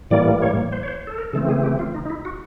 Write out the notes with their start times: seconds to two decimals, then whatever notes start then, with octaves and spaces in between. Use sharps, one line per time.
0.11 A2 E3 G3 A#3 D5
0.42 C#5
0.72 C5
0.83 C#5
0.88 C5
1.07 A4
1.18 A#4
1.33 C#3 E3 A3 C4 A4
1.49 G#4
1.63 G4
1.79 F4
1.94 D#4
2.05 D#4
2.10 E4
2.25 F#4